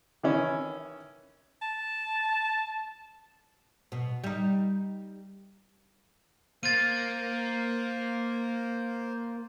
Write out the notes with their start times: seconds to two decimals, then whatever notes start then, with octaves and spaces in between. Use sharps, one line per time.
0.23 D#3 E3 C#4
1.62 A5
3.92 B2
4.24 G3 D#4
6.63 A#3 C5 A6 D#7